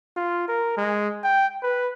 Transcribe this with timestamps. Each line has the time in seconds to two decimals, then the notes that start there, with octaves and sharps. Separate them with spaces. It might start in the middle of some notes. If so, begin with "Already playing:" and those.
0.16 F4
0.48 A#4
0.77 G#3
1.24 G5
1.63 B4